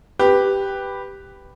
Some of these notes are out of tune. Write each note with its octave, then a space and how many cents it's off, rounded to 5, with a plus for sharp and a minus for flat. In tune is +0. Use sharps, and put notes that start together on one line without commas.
G4 +0 B4 +0